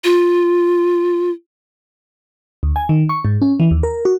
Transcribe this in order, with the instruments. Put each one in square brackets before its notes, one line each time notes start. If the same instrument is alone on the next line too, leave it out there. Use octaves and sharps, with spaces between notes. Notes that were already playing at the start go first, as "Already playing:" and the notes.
[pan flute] F4
[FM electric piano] D2
G#5
D#3
C#6
G#2
C#4
E3
D#2
A#4
F#4